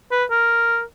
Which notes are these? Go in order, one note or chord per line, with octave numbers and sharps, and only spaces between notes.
B4
A#4